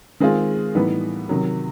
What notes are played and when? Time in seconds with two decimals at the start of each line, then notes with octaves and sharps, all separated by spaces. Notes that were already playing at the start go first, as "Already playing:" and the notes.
0.20 D#3 G#3 C4 F4 G#4
0.75 A2 E3 G3 B3 D#4
1.29 C3 D#3 F#3